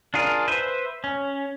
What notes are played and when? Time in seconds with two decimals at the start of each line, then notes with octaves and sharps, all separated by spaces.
0.14 D4 F4 G#4 A#4
0.48 B4 C5 E5
1.04 C#4